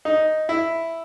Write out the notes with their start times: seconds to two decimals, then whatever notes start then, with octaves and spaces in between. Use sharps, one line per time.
0.05 D#4
0.49 E4